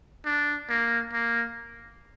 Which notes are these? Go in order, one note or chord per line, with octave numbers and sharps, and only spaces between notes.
D4
A#3
A#3